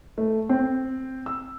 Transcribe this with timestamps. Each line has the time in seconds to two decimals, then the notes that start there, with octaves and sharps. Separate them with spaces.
0.18 A3
0.49 C4
1.26 E6